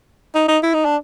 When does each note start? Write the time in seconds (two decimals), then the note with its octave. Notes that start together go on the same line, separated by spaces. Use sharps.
0.35 D#4
0.48 D#4
0.63 E4
0.74 D#4
0.85 D4